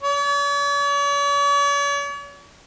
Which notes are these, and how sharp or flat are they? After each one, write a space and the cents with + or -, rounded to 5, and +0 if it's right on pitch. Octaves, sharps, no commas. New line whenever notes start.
C#5 +45